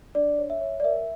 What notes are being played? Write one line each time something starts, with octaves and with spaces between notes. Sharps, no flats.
D4 D5
C#5
E5
C#5
D5
A#4 E5